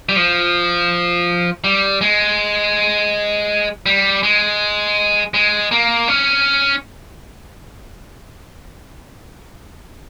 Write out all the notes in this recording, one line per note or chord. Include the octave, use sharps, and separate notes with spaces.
G3
F3
G3
G#3
G3
G#3
G#3
A#3
C#4